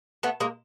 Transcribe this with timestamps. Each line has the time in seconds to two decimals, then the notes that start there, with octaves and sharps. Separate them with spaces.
0.23 A3 B3
0.40 G#3 A#3